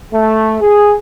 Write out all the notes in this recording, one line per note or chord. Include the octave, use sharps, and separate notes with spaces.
A3
G#4